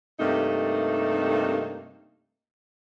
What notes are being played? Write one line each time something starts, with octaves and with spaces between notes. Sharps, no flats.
G2 C3 A3 A#3 D#4